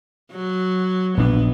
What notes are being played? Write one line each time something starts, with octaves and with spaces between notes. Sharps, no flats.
F#3
A#1 B3 D4